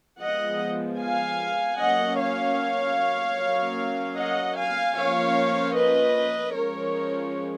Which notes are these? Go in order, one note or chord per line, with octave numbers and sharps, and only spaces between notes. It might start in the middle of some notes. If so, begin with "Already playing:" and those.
F3 G#3 B3 D#5 F#5
F5 G#5
F#3 A#3 C#4 D#5 F#5
C#5 F5
F#3 A#3 C#4
D#5 F#5
F5 G#5
F3 A#3 C#4 C#5 F5
B4 D#5
F3 G#3 C#4 A#4 C#5